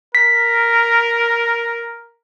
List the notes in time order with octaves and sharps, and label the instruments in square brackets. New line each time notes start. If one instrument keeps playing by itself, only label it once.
[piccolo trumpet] A#4 [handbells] B6